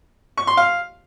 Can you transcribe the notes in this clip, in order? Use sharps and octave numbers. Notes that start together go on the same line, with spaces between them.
C#6
C6
F5